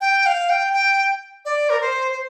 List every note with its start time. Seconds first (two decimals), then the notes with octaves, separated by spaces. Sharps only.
0.01 G5
0.26 F5
0.50 G5
0.73 G5
1.45 D5
1.70 A#4
1.81 C5
2.12 C5